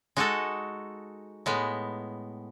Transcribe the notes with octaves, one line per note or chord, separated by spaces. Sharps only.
G#3 D#4 F#4 A4
A2 G#3 B3